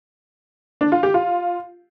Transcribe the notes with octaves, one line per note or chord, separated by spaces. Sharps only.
D4
F4
G4
F4